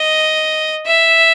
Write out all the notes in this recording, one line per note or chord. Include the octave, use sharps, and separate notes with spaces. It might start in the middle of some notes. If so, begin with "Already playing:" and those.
Already playing: D#5
E5